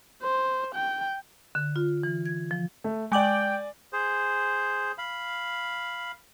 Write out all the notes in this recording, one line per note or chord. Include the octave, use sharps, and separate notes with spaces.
C5
G5
D3
F4
E3
G#6
F3
A3
G#3 D5 G5 G#5 D6 F#7
G#4 C5
F5 B5